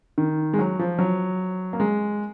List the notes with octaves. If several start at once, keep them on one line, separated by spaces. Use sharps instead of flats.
D#3
G#3
F#3
F3
F#3
A#3
G#3